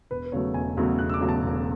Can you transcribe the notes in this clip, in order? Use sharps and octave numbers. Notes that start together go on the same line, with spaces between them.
E1 B4
B4
E2 C#3 F#3 A3 C#5
E1 G#5
E2 C#3 F#3 A3
E1 F#6
E6
D6
E2 C#3 F#3 A3
A5
E1